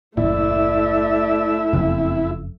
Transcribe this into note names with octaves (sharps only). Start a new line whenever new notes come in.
F#1 D#2 A#2 A3 E4 D5 E5
F#1 F2 C#3 A#3 C4